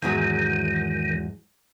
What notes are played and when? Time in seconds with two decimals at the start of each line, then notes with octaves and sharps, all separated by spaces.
0.02 E2 G#2 D#3 F#3